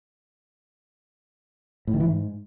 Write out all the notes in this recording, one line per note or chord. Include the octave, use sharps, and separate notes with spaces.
A2
D#3
E3
G#2